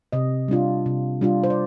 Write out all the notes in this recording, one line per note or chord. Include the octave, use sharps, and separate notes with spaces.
C3 D#5
G3 D4 F4
C3
G3 D4 F4
C5
D5